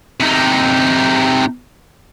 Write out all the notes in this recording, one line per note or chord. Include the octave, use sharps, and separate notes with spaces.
C3 D#4